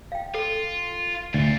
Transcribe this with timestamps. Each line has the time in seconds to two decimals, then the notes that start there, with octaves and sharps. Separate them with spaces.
0.12 F5 G5
0.34 F4 A4
1.34 D2 D5 F5